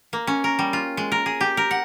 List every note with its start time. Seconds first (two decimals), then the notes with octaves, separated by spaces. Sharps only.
0.13 A#3
0.27 C#4
0.44 A#4
0.59 G3
0.73 F4
0.97 G#3
1.12 A#4
1.26 G#4
1.41 G4
1.57 A#4
1.71 F#5